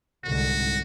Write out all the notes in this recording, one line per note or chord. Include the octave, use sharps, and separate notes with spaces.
C2 G#2 D3 F#4